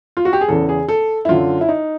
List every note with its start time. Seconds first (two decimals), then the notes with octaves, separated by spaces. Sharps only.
0.17 F4
0.25 F#4
0.33 G4
0.41 G#4
0.48 E2 C#3 E3 A4
0.69 G#4
0.89 A4
1.25 E4
1.29 F#2 D3 F4
1.61 E4
1.69 D#4